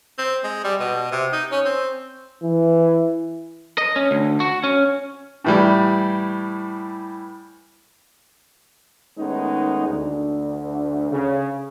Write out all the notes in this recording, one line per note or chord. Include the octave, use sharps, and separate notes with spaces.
C4
G#3
G3
B2
C3
D#4
C#4
C4
E3
D#5
C#4
D2
F#4
C#4
A2 E3 G3
D#3 G#3 A3 B3 C#4 D#4
D2
C#3